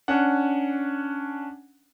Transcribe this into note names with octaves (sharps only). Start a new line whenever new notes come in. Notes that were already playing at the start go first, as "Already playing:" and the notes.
C#4 D4 F#5